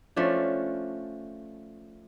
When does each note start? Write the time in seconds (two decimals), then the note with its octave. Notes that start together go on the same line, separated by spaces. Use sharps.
0.16 F3 A3 C#4 D4